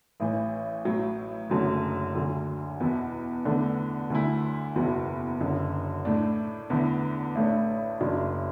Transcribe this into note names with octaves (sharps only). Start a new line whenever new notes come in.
A1 A2 E3
A1 A2 F#3
F#1 F#2 D3 F#3 A3
D2 D3 F#3
E2 B2 B3 E4
E2 D3 A3 D4
D2 D3 A3 E4
F#1 E2 B2 F#3
F#1 F#2 D3
A2 A3 D4
E2 D3 A3 E4
A1 A2 A3 D4
F#1 F#2 F#3 D4